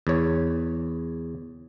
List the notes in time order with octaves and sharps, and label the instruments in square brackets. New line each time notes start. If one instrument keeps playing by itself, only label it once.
[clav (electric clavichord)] E2 C#5